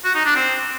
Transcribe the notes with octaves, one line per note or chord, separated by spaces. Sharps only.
F#4
D#4
D4
C4